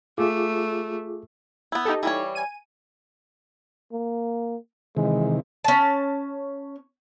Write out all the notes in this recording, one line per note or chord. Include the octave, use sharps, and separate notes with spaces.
A3 F4 G#4 D6
B3 E4
D#4 G4 A4
E3 G3 C#5
G#5 D#7
A#3
C3 D#3 E3 G#3
C#4 A5